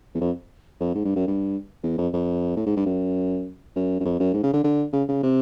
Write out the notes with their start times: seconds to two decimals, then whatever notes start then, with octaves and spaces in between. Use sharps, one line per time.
0.15 E2
0.21 F2
0.81 F2
0.95 G#2
1.05 G2
1.16 F#2
1.27 G2
1.83 E2
1.98 F2
2.13 F2
2.57 A2
2.67 G#2
2.77 G2
2.86 F#2
3.76 F#2
4.00 F#2
4.05 F2
4.20 F#2
4.34 G#2
4.44 C#3
4.54 D3
4.64 D3
4.93 C#3
5.08 C#3
5.23 C3